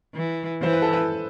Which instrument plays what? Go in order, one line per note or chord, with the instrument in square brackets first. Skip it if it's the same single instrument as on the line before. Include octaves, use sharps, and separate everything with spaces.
[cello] E3
[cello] E3 [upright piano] C5
[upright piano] B4
A4
B4